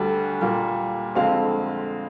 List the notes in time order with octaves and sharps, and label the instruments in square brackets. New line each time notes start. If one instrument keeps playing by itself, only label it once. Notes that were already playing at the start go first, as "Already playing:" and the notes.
Already playing: [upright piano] D2 D3 G3
A#2 G3 A#3
F2 D3 G#3 C4 F5